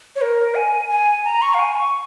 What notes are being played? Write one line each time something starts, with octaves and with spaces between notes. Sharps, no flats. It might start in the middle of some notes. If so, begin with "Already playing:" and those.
C#5
A#4
G#5
G#5
A#5
C#6
F5
G#5
C#6